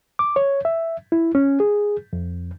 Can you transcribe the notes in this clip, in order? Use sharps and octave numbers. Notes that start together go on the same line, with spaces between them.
D6
C#5
E5
E4
C#4
G#4
F2